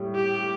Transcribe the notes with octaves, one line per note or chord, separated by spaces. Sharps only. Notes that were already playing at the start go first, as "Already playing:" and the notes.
Already playing: A2 G3
G4